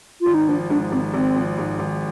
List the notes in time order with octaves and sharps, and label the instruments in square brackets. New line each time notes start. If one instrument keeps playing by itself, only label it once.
[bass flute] F4
[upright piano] G#1
[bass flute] D#4
[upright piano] F3 [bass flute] D4
[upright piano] G#2 [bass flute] D4
[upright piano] G#1 [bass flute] C4
[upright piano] G#1 [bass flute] C4
[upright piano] F3
G#2
G#1